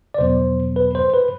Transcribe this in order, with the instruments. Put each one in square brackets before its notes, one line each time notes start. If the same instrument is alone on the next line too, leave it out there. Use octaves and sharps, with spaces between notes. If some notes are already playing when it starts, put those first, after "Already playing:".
[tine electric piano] D5
E2 B2 F#3 B3 C5
B4
C5
B4